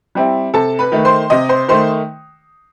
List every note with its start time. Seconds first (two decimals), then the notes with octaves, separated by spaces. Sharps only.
0.15 G3 C4 E4
0.54 C3 A4 A5
0.79 B4 B5
0.92 D#3 A3
1.05 C5 C6
1.30 C3 D#5 D#6
1.49 C5 C6
1.68 D#3 A3 C5 C6